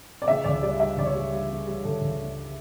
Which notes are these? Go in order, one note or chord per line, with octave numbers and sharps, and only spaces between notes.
D5
C#3 E5
C#2 D5
G3 D5
G3 E5
C#2 D5
C#5
G3
G3
C#3
G3
C#2 A4
C#2
C#3